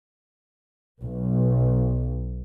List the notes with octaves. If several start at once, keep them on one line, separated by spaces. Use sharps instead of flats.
B1